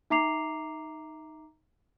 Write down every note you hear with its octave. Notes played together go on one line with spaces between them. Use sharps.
D#4 E5 A#5 D6 C7 F7